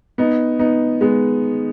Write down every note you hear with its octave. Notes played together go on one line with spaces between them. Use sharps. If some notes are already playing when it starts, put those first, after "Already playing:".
B3 D#4
B3 D#4
G#3 B3